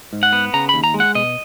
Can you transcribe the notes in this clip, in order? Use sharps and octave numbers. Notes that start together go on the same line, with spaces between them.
G#2
F#5
B3
C#3 A#5
D#2 B5
A#5
G#3
F#5
B2 D#5